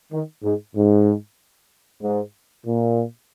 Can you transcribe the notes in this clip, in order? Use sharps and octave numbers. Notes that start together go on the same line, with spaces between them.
D#3
G#2
G#2
G#2
A#2